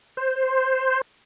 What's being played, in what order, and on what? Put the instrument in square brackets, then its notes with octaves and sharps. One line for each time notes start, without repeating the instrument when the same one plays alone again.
[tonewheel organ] C5